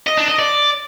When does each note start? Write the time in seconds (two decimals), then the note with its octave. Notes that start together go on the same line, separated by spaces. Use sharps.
0.07 D#5
0.17 D4
0.28 D#5
0.39 D5